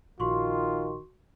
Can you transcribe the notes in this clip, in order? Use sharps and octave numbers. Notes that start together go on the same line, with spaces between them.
A#1 D#3 F4 F#4 C6 C#6